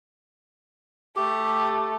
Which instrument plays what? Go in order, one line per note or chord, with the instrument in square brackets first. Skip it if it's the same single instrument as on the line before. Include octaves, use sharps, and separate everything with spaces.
[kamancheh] A3 [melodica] G4